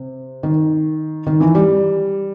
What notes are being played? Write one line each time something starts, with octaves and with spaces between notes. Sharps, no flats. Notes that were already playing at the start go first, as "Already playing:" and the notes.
Already playing: C3
D#3
D#3
E3
G3